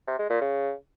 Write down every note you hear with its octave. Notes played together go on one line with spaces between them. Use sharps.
C3
G#3
A#2
C#3